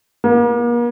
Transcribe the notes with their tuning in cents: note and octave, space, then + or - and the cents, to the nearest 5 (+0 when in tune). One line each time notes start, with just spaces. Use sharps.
A#3 +40